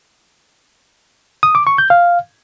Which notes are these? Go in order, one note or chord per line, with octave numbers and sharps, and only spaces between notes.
D#6
D6
C#6
G6
F5